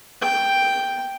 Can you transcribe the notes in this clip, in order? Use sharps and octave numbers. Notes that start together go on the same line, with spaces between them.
G5